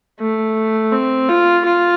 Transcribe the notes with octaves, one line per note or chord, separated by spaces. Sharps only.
A3
C4
F4
F4